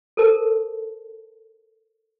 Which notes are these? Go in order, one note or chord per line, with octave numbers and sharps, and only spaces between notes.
A4 A#4 C5 A5